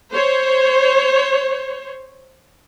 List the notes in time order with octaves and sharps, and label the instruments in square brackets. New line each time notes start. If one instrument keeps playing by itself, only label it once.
[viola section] C5 C#5